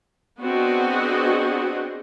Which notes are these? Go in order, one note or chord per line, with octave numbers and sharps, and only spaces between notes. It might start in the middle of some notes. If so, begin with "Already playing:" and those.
B3 C4 D4 F#4 G#4 D#5